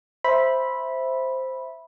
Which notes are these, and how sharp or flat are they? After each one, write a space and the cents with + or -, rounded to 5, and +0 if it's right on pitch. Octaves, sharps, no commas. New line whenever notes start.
C5 +0 E5 +0 B5 -10